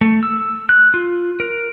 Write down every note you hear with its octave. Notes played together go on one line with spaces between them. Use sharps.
A3
E6
F#6
F4
A#4